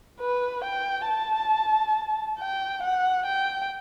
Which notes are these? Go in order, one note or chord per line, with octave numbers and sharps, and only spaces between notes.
B4
G5
A5
G5
F#5
G5